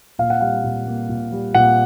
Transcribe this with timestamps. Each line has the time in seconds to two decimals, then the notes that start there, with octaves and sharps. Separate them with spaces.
0.19 A#2 F5
0.30 F#5
0.41 G3 F5
0.64 A#2
0.87 A#3
1.09 A#2
1.32 G3
1.55 A#2 F#5